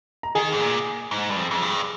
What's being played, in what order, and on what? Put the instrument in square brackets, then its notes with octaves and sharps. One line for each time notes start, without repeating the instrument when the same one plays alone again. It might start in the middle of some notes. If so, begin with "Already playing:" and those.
[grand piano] A#5
[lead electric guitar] D#3 [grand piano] G#4 G#5
[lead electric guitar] G#2
A#2
G#2
G2
F2
F2
G2